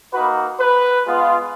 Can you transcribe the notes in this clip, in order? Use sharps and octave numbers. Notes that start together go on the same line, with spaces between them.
A#3 D#4 F#4 B4
B4
G#3 B3 F4